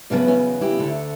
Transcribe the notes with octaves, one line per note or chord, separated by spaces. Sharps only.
E2 C#3 F#3 B3 D4
C#4 E4
E4 G4
D2 D3 A3